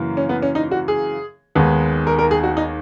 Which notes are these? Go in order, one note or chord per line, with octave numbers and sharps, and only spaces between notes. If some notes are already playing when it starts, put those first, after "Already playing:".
Already playing: F#2 C#3 E3 A#3
C#4
B3
C#4
D#4
F#4
G#4
D#2 D#3 G#3 B3
A#4
A#4
G#4
F#4
D#4